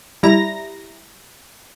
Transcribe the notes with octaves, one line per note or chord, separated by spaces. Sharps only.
G3 E4 A#5 A#6